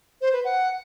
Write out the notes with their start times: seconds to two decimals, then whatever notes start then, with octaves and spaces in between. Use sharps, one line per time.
0.21 C5
0.33 B4
0.44 F#5